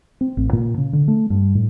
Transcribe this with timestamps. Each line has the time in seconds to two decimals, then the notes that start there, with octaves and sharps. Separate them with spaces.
0.21 C4
0.37 A1
0.53 A#2
0.78 C#3
0.93 D3
1.08 A3
1.30 G2
1.55 A2